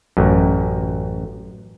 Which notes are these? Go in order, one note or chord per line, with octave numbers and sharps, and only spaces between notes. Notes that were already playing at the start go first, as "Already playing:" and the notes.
A1 F#2